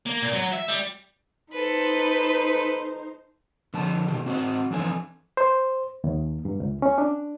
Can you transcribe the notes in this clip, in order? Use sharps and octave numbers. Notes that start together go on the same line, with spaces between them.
A#3
A#2
F#3
E5
G3
D#4 A4 B4 C5
D3 F3 A5
B2 D#3 G4
C4 F#4 C5 D#5 F#5
E3 F3 C4 D4 A4 G#5
C5
D#2
G2
C#2
C#4
D4